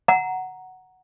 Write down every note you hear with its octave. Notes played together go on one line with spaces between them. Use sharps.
F#5 A#5